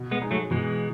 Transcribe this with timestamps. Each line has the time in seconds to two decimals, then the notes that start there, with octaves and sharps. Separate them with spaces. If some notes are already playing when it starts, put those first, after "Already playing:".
Already playing: B2
0.11 G#3 B3
0.21 G#3 D#4
0.31 F#3 A3
0.51 B2 E3 G#3